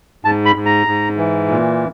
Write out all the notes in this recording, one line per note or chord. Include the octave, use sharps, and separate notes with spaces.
G#2 A5
B5
G#2
A#5
G#2
E3
A#2